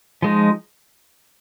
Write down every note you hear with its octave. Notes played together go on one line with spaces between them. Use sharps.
F3 G#3 D#4